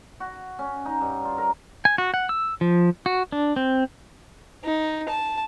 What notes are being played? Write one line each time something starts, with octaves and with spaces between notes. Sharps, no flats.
F#4
C#4
D#4
G2
F4
A#4
G#5
F#4
F#5
E6
F3
F#4
D4
C4
D#4
A5